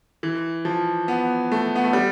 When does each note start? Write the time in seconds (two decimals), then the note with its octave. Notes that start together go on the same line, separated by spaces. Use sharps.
0.23 E3
0.65 F3
1.08 B3
1.52 A3
1.76 B3
1.84 A3
1.93 G3